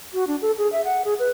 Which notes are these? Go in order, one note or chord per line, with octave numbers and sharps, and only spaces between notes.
F#4
D4
A4
G#4
E5
F#5
G#4
B4